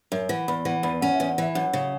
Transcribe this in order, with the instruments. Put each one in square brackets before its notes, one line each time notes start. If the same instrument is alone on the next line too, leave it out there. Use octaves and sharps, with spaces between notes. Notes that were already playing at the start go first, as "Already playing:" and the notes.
[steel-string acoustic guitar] F#2 [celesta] E5
[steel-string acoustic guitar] E3 [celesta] F#5
[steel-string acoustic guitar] E2 [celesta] B5
[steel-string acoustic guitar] E3 [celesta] F#5
[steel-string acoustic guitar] E2 [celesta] B5
[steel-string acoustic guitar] C#4 [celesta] F#5
[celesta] E5
[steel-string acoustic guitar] E2
[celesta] F#5
[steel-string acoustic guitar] E3 [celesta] E5
[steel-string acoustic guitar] F#2 [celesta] F#5
[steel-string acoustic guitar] C#3